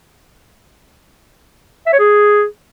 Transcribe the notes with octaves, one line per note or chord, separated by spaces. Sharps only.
E5
C#5
G#4